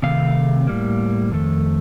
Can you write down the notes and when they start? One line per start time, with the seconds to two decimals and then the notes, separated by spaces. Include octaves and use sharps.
0.02 C3 D#3 A3 C4 F5
0.67 A2 G3 A#3
1.32 F2 D#3 A3